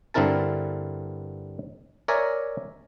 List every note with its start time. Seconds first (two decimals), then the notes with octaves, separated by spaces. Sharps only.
0.14 G2 D3 C4 E4 A#4 A5
2.08 A#4 C#5 D5 E5 G#5 A#5